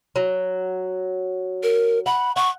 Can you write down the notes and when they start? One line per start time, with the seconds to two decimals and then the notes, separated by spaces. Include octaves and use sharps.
0.16 F#3
1.63 A#4
2.06 F#5 B5
2.36 F#5 C#6